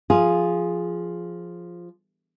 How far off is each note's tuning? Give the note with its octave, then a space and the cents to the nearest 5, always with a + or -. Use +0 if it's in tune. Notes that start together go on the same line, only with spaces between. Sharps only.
F3 +0 F4 +0 G#4 +0